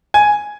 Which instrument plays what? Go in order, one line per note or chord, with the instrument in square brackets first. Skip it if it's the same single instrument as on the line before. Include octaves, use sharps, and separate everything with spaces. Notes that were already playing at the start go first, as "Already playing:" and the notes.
[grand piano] G#5